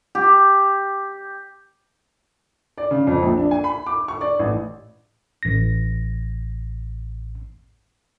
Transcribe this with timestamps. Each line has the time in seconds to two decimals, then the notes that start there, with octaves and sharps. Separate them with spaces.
0.15 G4
2.78 D5
2.91 C#3
3.07 F2
3.22 A#1
3.38 D4
3.51 G#5
3.64 B5
3.86 D6
4.08 C#6
4.21 D5
4.39 A1
5.43 A1 A#6